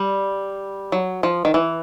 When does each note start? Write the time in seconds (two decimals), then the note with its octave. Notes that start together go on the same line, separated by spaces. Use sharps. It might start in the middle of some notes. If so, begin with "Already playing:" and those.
Already playing: G3
0.92 F#3
1.23 F3
1.45 D#3
1.54 E3